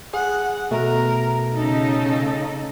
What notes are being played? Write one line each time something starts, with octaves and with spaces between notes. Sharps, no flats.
G#4 F#5
B2 A3 A#4
C#3 D#4 A4